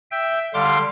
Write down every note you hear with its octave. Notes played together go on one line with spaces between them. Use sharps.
E5 G5
D3 G3 F5 C6 D6